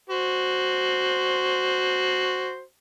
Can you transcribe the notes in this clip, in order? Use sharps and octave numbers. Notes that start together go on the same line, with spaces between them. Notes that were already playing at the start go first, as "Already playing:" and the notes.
F#4 C5